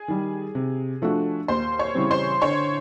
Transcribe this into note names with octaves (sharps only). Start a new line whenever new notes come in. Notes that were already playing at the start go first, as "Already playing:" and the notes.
Already playing: G#4 G#5
D#3 G3
C3
F3 A3 D4 F#4
D#2 C5 C6
C#5 C#6
C#3 E3 G3 C4
C5 C6
D3 C#5 C#6